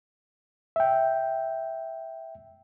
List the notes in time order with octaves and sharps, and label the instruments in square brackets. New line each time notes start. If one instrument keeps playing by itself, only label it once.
[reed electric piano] E5 G5